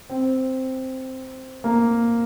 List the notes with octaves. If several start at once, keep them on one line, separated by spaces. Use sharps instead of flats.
C4
A#3